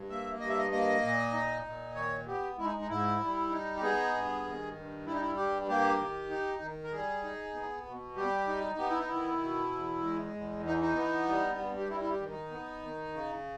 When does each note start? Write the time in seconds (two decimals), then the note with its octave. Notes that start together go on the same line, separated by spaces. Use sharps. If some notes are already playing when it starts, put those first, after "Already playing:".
Already playing: G2
0.10 A#3 E5
0.40 G2 D#5
0.49 E5
0.58 D#5
0.71 A#3 D#5
1.03 A#2
1.33 D#4
1.65 A#2
1.95 D#3 C#5
2.27 B3 G4
2.58 G#3 E4
2.65 D#4
2.81 D#4
2.88 G#2 E4
3.20 G3
3.51 D#4
3.77 G4
3.82 B3 G#4
4.14 G2
4.44 D#3
4.75 G2
5.06 G3 E4
5.14 D#4
5.20 E4
5.37 G2 G4
5.68 A#3 G4
5.99 D#3
6.30 D#4
6.62 D#3
6.84 A#4
6.92 G3 G#4
7.24 D#4
7.54 B3
7.86 B2
8.16 G3 G4
8.47 D#4
8.78 B3 G4
8.89 E4
8.99 D#4
9.08 D#3 E4
9.41 B2
9.72 E2
10.02 G#3
10.34 E2
10.65 E3 D#4
10.81 D#4
10.96 B3
11.27 G3
11.58 G2
11.77 G4
11.89 G3 E4
12.00 E4
12.10 G4
12.20 D#3
12.30 D#4
12.51 B3
12.82 D#3
13.13 C#3